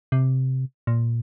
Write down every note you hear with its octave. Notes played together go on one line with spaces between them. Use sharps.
C3
A#2